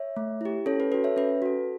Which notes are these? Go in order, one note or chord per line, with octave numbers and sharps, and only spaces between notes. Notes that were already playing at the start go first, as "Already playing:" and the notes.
Already playing: C#5 E5
A3
E4 G4
C#4 A4 C#5
B4
F#4 A4 B4
C#5 E5
C#4 B4
F#4 A4